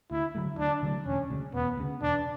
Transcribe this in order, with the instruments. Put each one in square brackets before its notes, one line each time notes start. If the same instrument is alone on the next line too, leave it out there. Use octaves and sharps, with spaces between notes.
[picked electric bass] D2 [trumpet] E4
[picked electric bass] D3 F#3 A3
[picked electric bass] D2 [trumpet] D4
[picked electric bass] D3 F#3 A3
[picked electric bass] E1 [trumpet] C#4
[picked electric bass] D2 C#3
[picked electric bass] E1 [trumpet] B3
[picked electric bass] D2 C#3
[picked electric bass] E1 [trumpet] D4